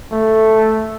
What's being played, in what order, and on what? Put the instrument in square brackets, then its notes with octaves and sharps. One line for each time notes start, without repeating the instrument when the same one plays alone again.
[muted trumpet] A3